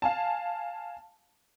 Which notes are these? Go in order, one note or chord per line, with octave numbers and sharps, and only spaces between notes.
F5 G#5 A5